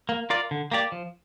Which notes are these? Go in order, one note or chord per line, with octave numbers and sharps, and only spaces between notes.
A#3
F4 A#4 D5
D3
A#3 G4 D5
F3